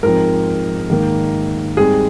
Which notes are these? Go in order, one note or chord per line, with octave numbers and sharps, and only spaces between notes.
G#2 F3 C4 A#4
G#2 D#3 A#3
G#2 G3 C4 G#4